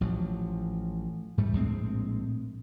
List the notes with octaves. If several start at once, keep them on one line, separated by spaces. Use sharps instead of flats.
A1 F3 F#3
G#2 G3 A3
A#1 A2 G#3 C4